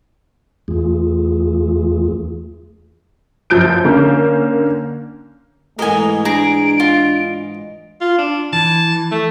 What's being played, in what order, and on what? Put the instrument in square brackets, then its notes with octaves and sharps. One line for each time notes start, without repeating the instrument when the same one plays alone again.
[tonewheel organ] E2 E3 A3 F4 G#4
[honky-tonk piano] F#2 F3 G6 D7
D3 A#3 C#4
[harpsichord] G#2 E3 G#3 [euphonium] A3 [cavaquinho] A#4 G#5 [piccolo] D#6
[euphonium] D4 [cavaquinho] G#4 A#5 [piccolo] D7
[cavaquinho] F4
[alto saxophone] F4
D4
[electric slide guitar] E3 [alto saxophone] A5
[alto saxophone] A3